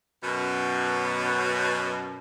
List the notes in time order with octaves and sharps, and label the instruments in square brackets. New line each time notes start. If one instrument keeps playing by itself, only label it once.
[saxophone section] F#2 B2